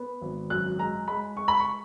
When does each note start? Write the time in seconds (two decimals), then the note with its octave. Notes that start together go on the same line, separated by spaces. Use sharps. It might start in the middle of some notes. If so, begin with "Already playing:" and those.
Already playing: B3
0.22 G#1
0.50 F#2 F#6
0.78 G#3 A#5
1.08 G#3 B5
1.36 G#3 C#6
1.48 B5
1.60 C#6